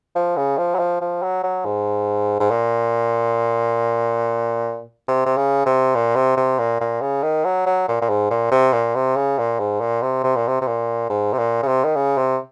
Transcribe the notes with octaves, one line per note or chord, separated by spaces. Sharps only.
F3
C#3
F3
F#3
F3
F3
F#3
F#3
G#2
G#2
A#2
C3
C3
C#3
C3
A#2
C3
C3
A#2
A#2
C#3
D#3
F#3
F#3
A#2
A#2
G#2
A#2
C3
A#2
C3
C#3
A#2
G#2
A#2
C3
C3
A#2
C3
C3
A#2
G#2
C3
A#2
C#3
C3
D#3
C#3
C3